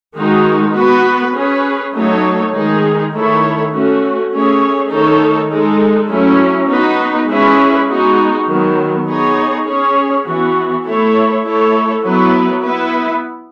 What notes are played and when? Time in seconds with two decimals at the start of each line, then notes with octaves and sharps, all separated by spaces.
0.16 D#3 G#3 D#4 F#4
0.75 B3 F#4 B4
1.34 C#4 G#4 B4
1.94 F#3 A3 D#4 A4 C#5
2.54 D#3 G#3 D#4 G#4
3.13 D#3 A3 E4 A4 C#5
3.72 A3 C#4 F#4
4.32 A3 C#4 G#4 C#5
4.91 D#3 A3 D#4 A4 C#5
5.50 G#3 D#4 A4
6.10 F#3 A3 C#4 E4
6.69 B3 D#4 F#4 B4
7.28 G#3 C#4 E4 G#4 B4
7.88 G#3 B3 D#4 F#4
8.47 D#3 F#3 B3
9.06 B3 D#4 G#4 C#5
9.66 C#4 G#4 C#5
10.25 E3 B3 F#4
10.85 A3 E4 A4 C#5
11.44 A3 E4 A4 C#5
12.04 F#3 B3 E4 B4
12.62 B3 E4 B4